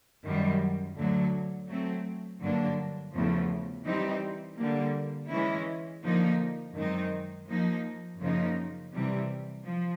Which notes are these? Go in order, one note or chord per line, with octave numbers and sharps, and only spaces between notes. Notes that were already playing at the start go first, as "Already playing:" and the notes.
F#2 D#3 G3
D2 D3 F#3
F#3 A3 C4
G2 D3 F#3 A#3 D4
E2 C#3 F3 A3
E3 G3 C4 D#4 G4
D3 G3 A#3
E3 G#3 C#4 E4
D3 F3 A#3 D#4
F#2 D#3 G#3 C4 D#4
F3 A#3 D#4
F#2 C#3 F3 A#3 D#4
C3 E3 G3
F3